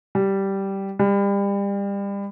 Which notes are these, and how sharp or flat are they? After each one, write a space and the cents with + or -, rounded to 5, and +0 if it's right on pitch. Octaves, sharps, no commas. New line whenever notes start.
G3 -10
G3 +30